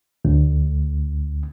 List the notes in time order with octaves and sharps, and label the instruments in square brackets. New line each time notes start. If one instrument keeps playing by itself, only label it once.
[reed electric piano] D2